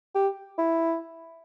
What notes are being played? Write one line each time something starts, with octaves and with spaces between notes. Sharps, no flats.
G4
E4